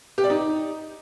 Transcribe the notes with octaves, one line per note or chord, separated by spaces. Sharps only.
G4
D5
D#4